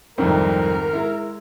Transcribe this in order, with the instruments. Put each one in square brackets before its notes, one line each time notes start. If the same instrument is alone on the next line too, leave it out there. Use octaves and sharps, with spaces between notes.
[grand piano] C2 F2 C4 [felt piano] G#2 D#3 [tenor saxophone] A#4
[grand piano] G#3 E4